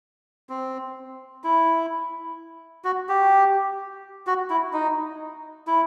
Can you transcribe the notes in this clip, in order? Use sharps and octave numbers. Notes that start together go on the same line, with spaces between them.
C4
E4
F#4
G4
F#4
E4
D#4
E4